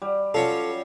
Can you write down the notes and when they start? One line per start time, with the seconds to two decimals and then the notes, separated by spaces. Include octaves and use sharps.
0.02 G3
0.34 F#3 C#4 F4 A4